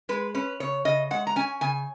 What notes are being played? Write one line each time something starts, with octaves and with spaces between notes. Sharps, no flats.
G#3 B4
C#4 B4
C#3 C#5
C#3 D#5
G#3 F#5
A#5
C#4 G#5
C#3 G#5